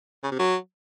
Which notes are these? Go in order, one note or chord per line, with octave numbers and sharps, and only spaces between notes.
C#3
C3
F#3